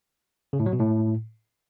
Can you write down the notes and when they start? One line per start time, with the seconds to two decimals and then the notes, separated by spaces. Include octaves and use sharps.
0.53 C#3
0.60 A2
0.66 F#3
0.73 B2
0.79 A2